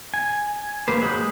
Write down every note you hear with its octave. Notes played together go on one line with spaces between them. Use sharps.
G#5
A#3 G4 B4 C5
F#3 G#3 B5 D#6 G6